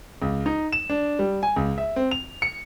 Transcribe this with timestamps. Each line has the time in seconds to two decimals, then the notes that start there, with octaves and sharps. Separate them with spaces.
0.22 C#2
0.46 D#4
0.73 E7
0.90 D4
1.19 G3
1.43 G#5
1.56 C#2
1.78 E5
1.96 C4
2.11 F7
2.42 C#7